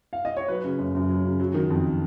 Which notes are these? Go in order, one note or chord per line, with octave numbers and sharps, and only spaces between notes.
F5
D#5
C#5
F#3 B4
C#3
F#2
F#2
F#3
C#3
F#3
D#3
F2